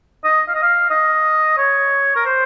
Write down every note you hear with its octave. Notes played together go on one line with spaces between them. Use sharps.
D#5
F5
D#5
F5
D#5
C#5
A#4
C5